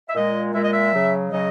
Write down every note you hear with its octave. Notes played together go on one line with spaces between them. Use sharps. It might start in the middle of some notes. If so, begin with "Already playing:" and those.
E5
A#2 G#3 D#5
A#2 G#3 E5
D#5
E5
C#3 F#3
C#3 F#3 D#5